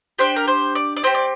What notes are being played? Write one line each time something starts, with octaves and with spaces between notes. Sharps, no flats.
D4 G4 C5
A#4
C5
D5
D5
C4 G4 C5
D5